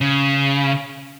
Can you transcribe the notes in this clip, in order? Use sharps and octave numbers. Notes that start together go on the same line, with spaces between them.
C#3